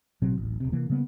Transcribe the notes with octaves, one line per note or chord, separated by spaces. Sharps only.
A1 B2 F#3 C4
D1 A1
D#1 C3
C3 E3 A#3
C#3 G3 A#3 B3